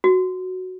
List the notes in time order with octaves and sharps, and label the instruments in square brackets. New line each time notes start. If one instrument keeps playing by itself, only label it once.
[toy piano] F#4